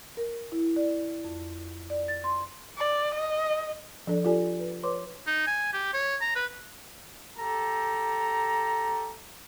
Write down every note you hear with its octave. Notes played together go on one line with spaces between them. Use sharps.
A#4
E4
D5
F2
D5
A6
C6
D5
D#5
F3 D4 A4 D5
F4 G4 A4 D5 G#5
B4
B4 C#5 C6 D6
D#4
G#5
G4
C#5
A#5
B4
G4 A4 A#5